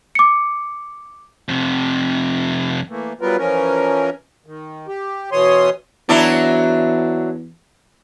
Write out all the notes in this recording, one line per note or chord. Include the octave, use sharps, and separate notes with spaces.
D6 C#7
F2 C3
E3 A3 A#3
F#3 G3 B3 F4 A#4 B4
E3 F3 C#4 A#4
D#3
G4
B2 E3 C#5 C6 D#6
E2 F#3 D4 E4